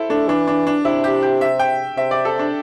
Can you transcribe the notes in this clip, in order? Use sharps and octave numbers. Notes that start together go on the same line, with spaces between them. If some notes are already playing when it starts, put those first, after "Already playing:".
Already playing: E4 A4 C5
A3 D4
E3 D4
D4
D4
C3 E4
G4
G4
E5
G5
C3 E5
D5
A4
D4